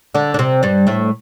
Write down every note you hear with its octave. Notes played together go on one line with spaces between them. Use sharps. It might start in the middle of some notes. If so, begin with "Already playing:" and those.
D3 D4
D4
C3 C4
G2 G3
A2 A3